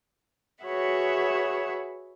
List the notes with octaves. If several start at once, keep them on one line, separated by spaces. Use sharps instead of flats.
F#4 G#4 B4 C#5 E5 F#5